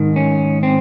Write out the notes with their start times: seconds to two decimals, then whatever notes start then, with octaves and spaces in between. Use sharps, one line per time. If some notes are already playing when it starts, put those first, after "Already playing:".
Already playing: G#2 D#3
0.16 C#4
0.63 C4